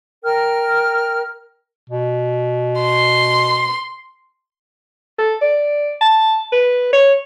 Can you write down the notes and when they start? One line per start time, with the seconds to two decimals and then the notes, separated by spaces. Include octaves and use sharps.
0.24 A#4 G5 F6
1.90 B2
2.81 C6
5.19 A4
5.41 D5
6.01 A5
6.52 B4
6.93 C#5